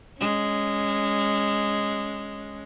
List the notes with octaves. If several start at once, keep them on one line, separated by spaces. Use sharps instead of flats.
G#3 C#4